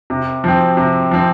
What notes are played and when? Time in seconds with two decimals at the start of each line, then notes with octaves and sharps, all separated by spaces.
0.10 C3
0.44 F3 C4
0.77 C3
1.11 F3 C4